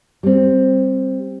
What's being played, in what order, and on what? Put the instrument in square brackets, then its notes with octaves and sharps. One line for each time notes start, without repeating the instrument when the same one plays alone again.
[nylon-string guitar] G3 C4